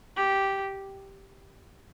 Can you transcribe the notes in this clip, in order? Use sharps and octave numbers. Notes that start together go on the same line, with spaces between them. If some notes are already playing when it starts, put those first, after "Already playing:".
G4